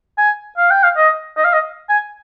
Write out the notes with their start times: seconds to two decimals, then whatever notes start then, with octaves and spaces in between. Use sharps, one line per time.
0.18 G#5
0.58 F5
0.71 G5
0.83 F5
0.97 D#5
1.37 D#5
1.45 F5
1.53 D#5
1.89 G#5